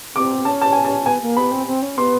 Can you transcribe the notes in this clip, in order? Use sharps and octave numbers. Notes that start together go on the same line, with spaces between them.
C4 D6
C#4 A5
A5
G#5
A5
B3 G#5
A#3
B3 B5
C4
C4
C#4
B3 C6